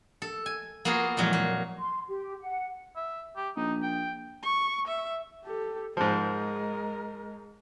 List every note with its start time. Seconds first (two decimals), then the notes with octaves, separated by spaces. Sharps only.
0.22 A4
0.46 G#5
0.85 A#3 B3 F4 F#4 G#4
1.17 F2 A#2 E3 F#3 G#3
1.33 A#3
1.78 C6
2.07 G4
2.40 F#5
2.96 E5
3.36 G4
3.57 A#1 D#4
3.83 G5
4.43 C#6
4.87 E5
5.44 G4 A4
5.97 G#2 F3 G#3 A#4